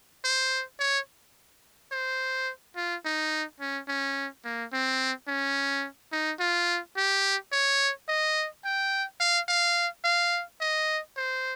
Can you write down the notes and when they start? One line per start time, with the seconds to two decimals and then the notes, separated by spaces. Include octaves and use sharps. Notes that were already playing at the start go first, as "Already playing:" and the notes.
0.25 C5
0.80 C#5
1.92 C5
2.76 F4
3.05 D#4
3.61 C#4
3.88 C#4
4.45 A#3
4.73 C4
5.28 C#4
6.13 D#4
6.40 F4
6.97 G4
7.52 C#5
8.08 D#5
8.65 G5
9.20 F5
9.48 F5
10.04 F5
10.61 D#5
11.17 C5